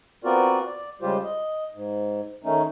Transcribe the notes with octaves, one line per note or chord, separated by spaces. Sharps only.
B3 C4 F4 F#4 A#4 D5
D5
C#3 G3 G#3 F4 G4 C5
D#5
G#2
D#3 A3 C#4 D#4